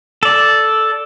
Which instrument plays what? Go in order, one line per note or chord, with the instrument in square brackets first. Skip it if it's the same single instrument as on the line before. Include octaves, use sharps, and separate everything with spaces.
[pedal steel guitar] A4 D5